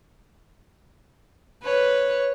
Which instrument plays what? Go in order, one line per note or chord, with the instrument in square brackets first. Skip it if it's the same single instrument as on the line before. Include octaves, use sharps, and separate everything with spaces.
[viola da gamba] B4 [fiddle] C#5